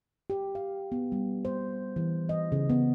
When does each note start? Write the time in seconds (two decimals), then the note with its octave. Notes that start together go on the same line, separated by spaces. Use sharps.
0.30 G4
0.55 F5
0.92 B3
1.12 G3
1.45 C5
1.96 E3
2.29 D#5
2.52 C#3
2.70 B3